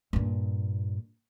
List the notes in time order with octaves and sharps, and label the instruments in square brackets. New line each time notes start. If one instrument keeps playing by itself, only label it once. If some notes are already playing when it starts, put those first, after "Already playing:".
[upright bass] G2 A#2